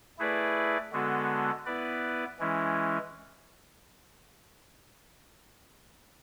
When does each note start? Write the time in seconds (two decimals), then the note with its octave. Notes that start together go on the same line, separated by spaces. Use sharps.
0.19 A3 E4 G#4 B4 D5
0.92 D3 G#3 B3 F#4 A4
1.66 B3 E4 B4 D5
2.39 E3 G#3 C#4 E4